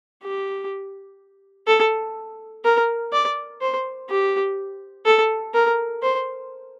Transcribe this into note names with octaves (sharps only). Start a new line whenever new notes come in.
G4
A4
A#4
D5
C5
G4
A4
A#4
C5